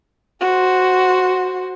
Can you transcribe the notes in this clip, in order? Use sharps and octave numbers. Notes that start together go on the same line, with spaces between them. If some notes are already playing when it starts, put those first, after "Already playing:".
F#4 C5